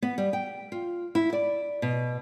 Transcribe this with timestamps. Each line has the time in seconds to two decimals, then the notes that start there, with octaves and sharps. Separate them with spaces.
0.02 B3
0.18 G3
0.33 G5
0.72 F4
1.15 E4
1.33 D5
1.82 B2